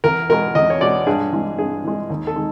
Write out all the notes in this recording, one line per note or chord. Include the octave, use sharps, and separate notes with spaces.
E2 A#4
B2 G#3 A#4
E2 D#5
C#5
B2 G#3 D5
G2 G#4
E3 G#3
G2 G#4
E3 G#3
D#2
A4
D#3 G#3